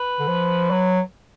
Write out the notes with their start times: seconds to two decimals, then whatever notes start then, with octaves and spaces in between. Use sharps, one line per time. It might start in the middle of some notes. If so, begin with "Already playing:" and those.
Already playing: B4
0.19 D3
0.28 F3
0.70 F#3